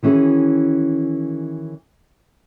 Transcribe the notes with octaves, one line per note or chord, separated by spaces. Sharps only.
D#3 E3 C#4 F#4 G#4